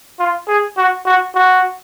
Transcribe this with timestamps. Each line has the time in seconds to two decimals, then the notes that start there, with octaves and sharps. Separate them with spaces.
0.19 F4
0.48 G#4
0.77 F#4
1.06 F#4
1.35 F#4